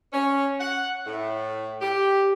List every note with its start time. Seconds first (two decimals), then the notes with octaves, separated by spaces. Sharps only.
0.13 C#4
0.60 F#5
1.06 A2
1.82 G4